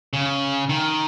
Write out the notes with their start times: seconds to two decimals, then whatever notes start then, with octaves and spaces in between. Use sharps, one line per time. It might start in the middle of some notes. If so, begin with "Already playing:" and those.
0.13 C#3
0.69 D#3